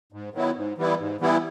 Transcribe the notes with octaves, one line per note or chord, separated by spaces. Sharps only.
G#2
D#3 F#3 B3 E4
G#2
E3 G3 B3 E4
G#2
E3 G3 B3 E4